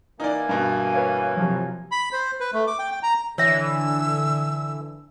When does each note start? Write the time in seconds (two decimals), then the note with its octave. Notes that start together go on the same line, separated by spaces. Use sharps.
0.20 E3 A#3 D#4 D5 G#5
0.49 G2 B2
0.92 B4 C#5 F5
1.36 C3 F3 F#3
1.92 B5
2.13 C5
2.40 B4
2.53 A3
2.67 D6
2.79 G5
2.92 G5
3.03 A#5
3.38 D3 E3 C#5 E5 E6